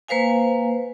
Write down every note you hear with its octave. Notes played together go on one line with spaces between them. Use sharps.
A#3 B4 C5 F5 G#5